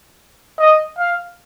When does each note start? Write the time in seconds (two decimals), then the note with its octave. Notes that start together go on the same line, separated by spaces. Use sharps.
0.59 D#5
0.98 F5